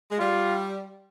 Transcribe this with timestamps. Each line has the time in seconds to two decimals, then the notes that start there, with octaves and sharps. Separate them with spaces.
0.11 G#3
0.19 G3 F4